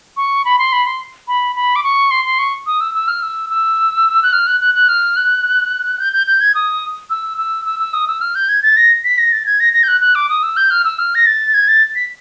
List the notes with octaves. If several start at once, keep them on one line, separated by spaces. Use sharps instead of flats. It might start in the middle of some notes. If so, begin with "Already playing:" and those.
C#6
B5
C6
B5
C6
B5
B5
D6
C#6
C6
C6
C#6
D#6
E6
E6
F6
E6
E6
F#6
F6
F#6
F#6
F#6
F6
F#6
G6
G6
G6
G#6
D#6
E6
E6
E6
E6
D#6
E6
F6
G6
G#6
A6
A#6
B6
A#6
A6
G#6
A#6
A#6
G6
F#6
F#6
D6
D#6
E6
G6
F6
E6
F6
A#6
A6
G#6
A6
B6